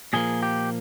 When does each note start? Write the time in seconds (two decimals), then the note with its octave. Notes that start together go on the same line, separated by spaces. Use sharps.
0.13 A#2 F3 A#3 G#4
0.43 G4